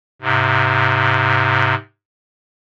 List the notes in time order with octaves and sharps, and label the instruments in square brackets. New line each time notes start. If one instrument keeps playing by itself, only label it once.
[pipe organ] G#2 C3